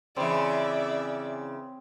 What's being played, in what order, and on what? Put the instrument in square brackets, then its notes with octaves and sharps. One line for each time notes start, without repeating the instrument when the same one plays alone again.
[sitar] C#3 E3 [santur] C4 [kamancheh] D5 E5